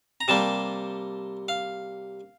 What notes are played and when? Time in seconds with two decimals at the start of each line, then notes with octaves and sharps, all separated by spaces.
0.21 A#5
0.28 C3 G3 A#3 A5
1.49 F5